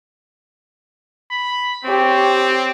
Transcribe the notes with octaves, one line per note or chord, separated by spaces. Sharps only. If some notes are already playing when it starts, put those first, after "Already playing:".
B5
C4 G4 C#5